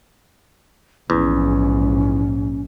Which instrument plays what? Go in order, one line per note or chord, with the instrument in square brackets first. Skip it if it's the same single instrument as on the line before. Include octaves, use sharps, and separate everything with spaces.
[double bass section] A#1 G#2 [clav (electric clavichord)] E2 [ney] C#4